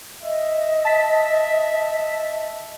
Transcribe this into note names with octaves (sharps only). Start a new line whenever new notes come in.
D#5 E5
A5 B6